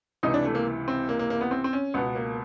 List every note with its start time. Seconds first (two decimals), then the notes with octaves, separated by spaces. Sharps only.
0.23 C#2 C3 E3 D#4
0.34 D4
0.45 A3
0.55 A#3
0.88 C4
1.09 A#3
1.19 A#3
1.30 A#3
1.41 B3
1.51 C4
1.64 C4
1.73 C#4
1.94 C#2 B2 B3
2.15 A#3